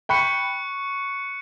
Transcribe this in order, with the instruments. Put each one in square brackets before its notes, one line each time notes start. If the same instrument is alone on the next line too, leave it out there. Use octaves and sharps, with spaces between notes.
[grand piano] G5 B5 [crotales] C#6 F#6 C#7